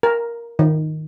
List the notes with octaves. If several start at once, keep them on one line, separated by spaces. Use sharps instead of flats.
A#4
D#3